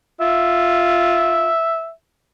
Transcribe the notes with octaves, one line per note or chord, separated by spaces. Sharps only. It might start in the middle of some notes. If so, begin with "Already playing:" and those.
F4 E5